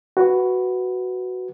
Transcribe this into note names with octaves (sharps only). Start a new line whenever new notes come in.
F#4 B4